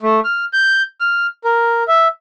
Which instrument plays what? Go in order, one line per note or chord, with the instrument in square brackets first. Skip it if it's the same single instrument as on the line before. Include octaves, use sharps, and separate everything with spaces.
[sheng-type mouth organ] A3
F6
G6
F6
A#4
E5